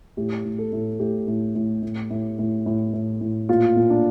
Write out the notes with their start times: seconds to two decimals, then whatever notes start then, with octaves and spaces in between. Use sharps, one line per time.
0.17 A2 G4
0.45 A2
0.58 A4
0.72 A2
0.99 A2 G4
1.27 A2
1.55 A2
1.83 A2
2.10 A2
2.39 A2
2.66 A2
2.93 A2
3.21 A2
3.49 A#2 F4
3.76 A#2
3.90 D4